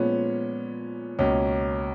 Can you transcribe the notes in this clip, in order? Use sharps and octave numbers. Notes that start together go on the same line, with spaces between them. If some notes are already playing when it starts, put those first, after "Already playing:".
Already playing: A#2 F3 G#3 B3 C#4
C#2 B2 A#3 C#4